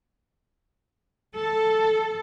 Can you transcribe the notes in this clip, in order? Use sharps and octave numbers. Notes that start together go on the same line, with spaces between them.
A4